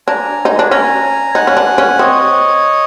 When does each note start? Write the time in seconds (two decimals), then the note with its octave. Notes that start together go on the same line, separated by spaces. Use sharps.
0.07 D4 G#5 A#5
0.45 D#4
0.59 D4
0.71 C#4 G#5 A#5
1.35 D#4 F#5 G#5
1.47 C#4
1.57 D4
1.78 C#4
1.99 C4 C#5 D#5